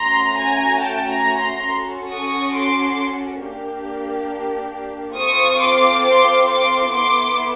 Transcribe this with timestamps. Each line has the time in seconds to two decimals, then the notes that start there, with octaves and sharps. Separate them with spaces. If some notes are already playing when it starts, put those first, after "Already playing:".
Already playing: A3 C#4 F#4 A#5 C6
0.36 G#5 A#5
0.79 G5 A5
1.08 G#5 A#5
1.38 A#5 C6
1.68 C#4 F#4 A4
2.10 C#6 D#6
2.54 C6 D6
3.43 A#3 D4 G4
5.17 C4 F4 A4 C#6 D#6
5.61 C6 D6
6.04 C6 D6
6.48 C6 D6
6.92 B3 E4 A4 C6 D6